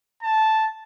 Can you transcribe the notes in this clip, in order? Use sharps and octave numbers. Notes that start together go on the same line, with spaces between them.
A5